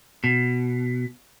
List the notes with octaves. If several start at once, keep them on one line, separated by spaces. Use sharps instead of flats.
B2